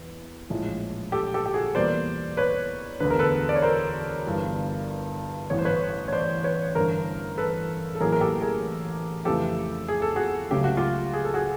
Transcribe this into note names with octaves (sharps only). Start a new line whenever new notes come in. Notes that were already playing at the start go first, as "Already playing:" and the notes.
Already playing: E2
A#1 A2 F3 G#3
G4 A4
G4 A4
G4
F#4 G#4
E2 B2 G3 A#3 C5 D5
B4 C#5
E1 D2 D3 B4
A#4
A4 B4
D5
C#5
A#4 C5
G1 G2 E3 G3
A1 G2 E3 C#5
C5
B4 C#5
C#5
C5 D5
B4 C#5
A1 G2 D3 A#4 C5
A4 B4
A4
A1 A2 F#3 A#3 G#4 A#4
A#4
G4 A4
G#4 A#4
F2 C#3 E3 A3 G4 A4
G#4
A4
F#4 G#4
C#2 C#3 F#3 A3 G4
F#4
F4 G4
G#4
A4
F#4 G#4